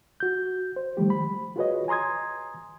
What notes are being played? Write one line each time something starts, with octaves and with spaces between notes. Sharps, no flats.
F#4 G6
C5
D#3 F3 G3 A3 G4
B5
F4 F#4 G#4 B4 C#5 D#5
G#5 A#5 C6 D#6 G#6